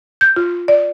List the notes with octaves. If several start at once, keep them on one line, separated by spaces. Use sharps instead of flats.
G6
F4
D5